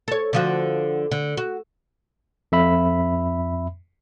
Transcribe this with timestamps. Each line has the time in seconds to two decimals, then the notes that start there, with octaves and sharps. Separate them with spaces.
0.08 A4 C#5
0.33 D3 F3 F#4
1.11 D3
1.37 F#4
2.52 F2 E5 B5